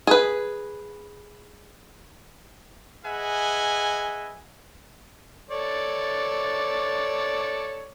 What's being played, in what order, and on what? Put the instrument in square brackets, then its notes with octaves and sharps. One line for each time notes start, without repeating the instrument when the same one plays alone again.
[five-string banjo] G#4 B4
[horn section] G#4 B4 D#5 E5 F#5 G#5
[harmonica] A4 C#5 D5